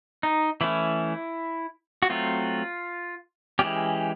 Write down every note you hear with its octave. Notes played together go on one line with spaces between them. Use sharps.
D#4
E3 A3 C#4 E4
F#4
F#3 A3 C4 F4
E3 G#3 C#4 G4